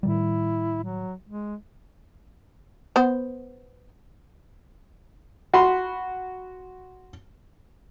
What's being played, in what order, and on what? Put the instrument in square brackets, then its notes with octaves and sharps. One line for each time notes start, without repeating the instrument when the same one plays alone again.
[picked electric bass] A2 D#3 G3 [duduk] E4
[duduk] F#3
G#3
[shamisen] B3 C5
[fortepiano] F#4 B5 C6